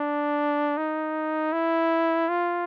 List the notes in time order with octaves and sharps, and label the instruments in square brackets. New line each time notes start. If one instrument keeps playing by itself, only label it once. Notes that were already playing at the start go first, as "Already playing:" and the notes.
Already playing: [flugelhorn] D4
D#4
E4
F4